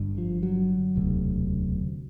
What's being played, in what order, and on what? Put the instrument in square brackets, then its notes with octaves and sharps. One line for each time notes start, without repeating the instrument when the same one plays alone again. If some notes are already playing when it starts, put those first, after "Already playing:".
Already playing: [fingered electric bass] G1 G2 D3
F3
F#3
E1 D2 C3